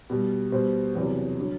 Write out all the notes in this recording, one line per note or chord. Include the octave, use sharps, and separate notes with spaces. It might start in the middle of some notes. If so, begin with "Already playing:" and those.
B2 G3
B2 G3 C5
E2 C3 F#3
D3 F#3